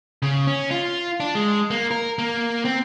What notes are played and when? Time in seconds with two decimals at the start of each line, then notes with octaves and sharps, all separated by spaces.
0.22 C#3
0.47 C#4
0.71 F4
1.20 D4
1.35 G#3
1.71 A#3
1.91 A#4
2.19 A#3
2.65 C4